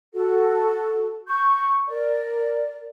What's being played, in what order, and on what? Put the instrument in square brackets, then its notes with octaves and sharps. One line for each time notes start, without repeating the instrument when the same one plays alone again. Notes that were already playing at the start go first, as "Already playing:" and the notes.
[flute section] F#4 A4
C#6 G6
A#4 D5